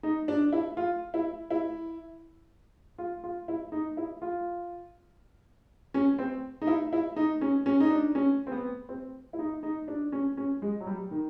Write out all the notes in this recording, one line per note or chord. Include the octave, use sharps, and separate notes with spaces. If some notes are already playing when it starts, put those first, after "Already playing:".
D#4
D4
E4
F4
E4
E4
F4
F4
E4
D#4
E4
F4
C#4
C4
D#4
E4
E4
D#4
C#4
C#4
D#4
D4
C#4
C4
B3
C4
E4
D#4
D#4
D4
C#4
C#4
G#3
F#3
G3
D#3